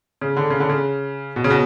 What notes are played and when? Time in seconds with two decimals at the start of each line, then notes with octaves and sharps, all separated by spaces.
0.21 C#3
0.37 D3
0.50 C#3
0.60 D3
0.69 C#3
1.36 B2
1.44 C#3
1.50 B2